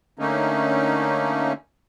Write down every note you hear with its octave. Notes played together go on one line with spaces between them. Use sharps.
D3 A3 A#3 C#4 D#4